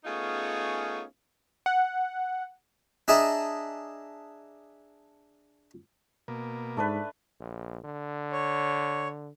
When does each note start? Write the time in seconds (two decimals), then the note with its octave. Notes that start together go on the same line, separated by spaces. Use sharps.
0.04 A3 B3 C#4 D#4 F4 G#4
1.66 F#5
3.08 D4 G#4 D#5 E5 A5 A#5
6.28 B2 A#3
6.77 G#2 A3 D4 B4
7.40 A#1
7.84 D3
8.32 C#5